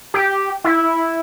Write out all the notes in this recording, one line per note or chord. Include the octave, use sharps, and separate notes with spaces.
G4
E4